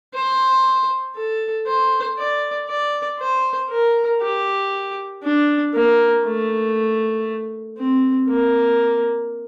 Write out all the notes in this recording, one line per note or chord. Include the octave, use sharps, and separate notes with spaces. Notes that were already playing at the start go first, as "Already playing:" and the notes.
C5
A4
C5
D5
D5
C5
A#4
G4
D4
A#3
A3
C4
A#3